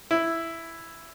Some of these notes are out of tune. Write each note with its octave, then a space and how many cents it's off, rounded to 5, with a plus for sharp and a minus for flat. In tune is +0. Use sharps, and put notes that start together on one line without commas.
E4 +5